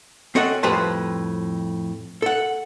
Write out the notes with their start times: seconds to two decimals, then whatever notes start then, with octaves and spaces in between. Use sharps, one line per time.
0.35 C4 C#4 A4 D#5 F#5
0.63 F2 A2 G3 B4 C5 A5
2.22 A4 F#5